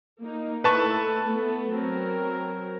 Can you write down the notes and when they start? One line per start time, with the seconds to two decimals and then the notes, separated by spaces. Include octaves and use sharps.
0.22 A#3 D#4
0.64 A3 E4 B4 A5 C#6
1.23 A3 B3
1.72 F#3 C4 A#4